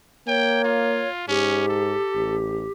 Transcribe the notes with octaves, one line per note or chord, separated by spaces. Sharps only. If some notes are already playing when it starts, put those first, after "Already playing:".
A#3 C#5 G5
F4
G#2 C#4 G4
A4
A1